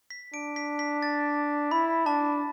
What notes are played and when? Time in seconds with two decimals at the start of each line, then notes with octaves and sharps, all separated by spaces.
0.10 B6
0.33 D4 D7
0.56 B6
0.79 B6
1.02 A6
1.71 E4 B5
2.06 D4 A5